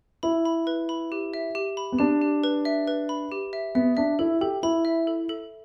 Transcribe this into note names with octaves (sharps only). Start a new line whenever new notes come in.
E4 B5
B5
B4
B5
G4
E5
G4
B5
B3
D4 G4
G4
B4
E5
B4
B5
G4
E5
B3 E5
D4 E5
E4 A4
G4 A4
E4 B5
E5
A4
A4